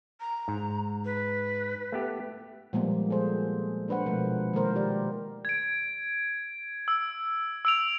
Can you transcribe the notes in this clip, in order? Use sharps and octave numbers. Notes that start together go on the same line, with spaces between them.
A#5
G#2
B4
A3 B3 G4
A#2 F3 G3 G#3 A#3 B3
G#4 A4 C5
A#3 D4 B4 C5 F#5
B2 F3 G#3 A3 A#4
D#3 G#3 A#3 A#4 C5
G4 D5
G#6 D7
E6
E6 D7 F7